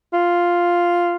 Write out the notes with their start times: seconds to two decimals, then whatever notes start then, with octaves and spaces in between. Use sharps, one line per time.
0.14 F4